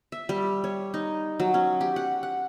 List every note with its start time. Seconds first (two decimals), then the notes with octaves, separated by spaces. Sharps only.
0.12 E5
0.29 G3
0.64 C#5
0.94 D#4
1.40 F#3
1.54 C#4
1.81 G4
1.96 F#5
2.23 F#5